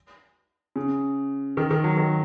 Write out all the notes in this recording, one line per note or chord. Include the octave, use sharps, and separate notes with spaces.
C#3
D#3
D#3
F#3
D#3